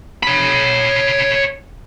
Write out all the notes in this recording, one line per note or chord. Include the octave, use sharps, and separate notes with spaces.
C#5 B5